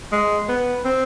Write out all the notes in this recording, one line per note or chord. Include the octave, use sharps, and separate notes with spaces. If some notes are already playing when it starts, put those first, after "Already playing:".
G#3
B3
C4